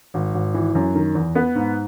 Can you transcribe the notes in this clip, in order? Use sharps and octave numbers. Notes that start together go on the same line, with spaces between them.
G#1
G#1
E3
F#2
D#3
E2
B3
G#2